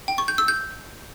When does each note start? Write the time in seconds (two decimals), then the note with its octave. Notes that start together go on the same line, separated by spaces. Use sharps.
0.08 G5
0.18 C#6
0.28 G6
0.38 E6
0.48 G6